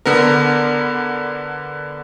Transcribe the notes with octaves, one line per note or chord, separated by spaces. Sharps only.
D3 B3 A#4